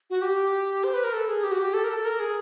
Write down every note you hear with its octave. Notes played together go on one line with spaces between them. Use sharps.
F#4
G4
C5
B4
A#4
A4
G#4
G4
F#4
G4
A4
A#4
A4
A#4
G#4